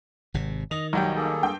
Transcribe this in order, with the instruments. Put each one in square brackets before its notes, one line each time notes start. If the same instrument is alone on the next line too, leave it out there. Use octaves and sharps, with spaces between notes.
[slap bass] G#1 C3
[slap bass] D#3 [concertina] D#5 [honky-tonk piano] F7
[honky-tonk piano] B1 [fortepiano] F#3 G3 G5 [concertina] C#5
[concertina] A#3 G#4 A4
[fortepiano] G2 [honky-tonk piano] G5